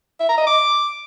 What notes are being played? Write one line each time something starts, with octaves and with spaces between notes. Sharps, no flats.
E5
A#5
D#5
D6